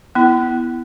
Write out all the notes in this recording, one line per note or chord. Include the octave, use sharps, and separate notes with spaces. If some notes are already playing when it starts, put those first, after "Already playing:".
B3 E4